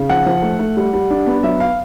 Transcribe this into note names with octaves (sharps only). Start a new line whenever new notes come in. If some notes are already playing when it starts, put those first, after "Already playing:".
Already playing: C#3
F3 F#5
F3
A3
A3
G3
G3
D4
B3
F#3 E5
F5